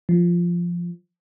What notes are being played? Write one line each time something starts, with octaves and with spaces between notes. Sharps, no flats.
F3